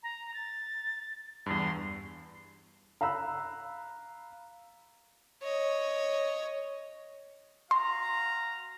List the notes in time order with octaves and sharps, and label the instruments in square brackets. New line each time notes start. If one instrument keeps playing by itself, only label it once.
[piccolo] A#5
A6
[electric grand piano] E2 G2 [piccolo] C6
[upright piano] F5 A#5 B5 E6 F#6
[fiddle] C#5 D#5
[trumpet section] F#4 F5 A#5 [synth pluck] C6